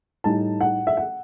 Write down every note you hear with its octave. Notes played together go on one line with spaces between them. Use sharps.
A2 G3 D#4 A5
F#5
E5
F#5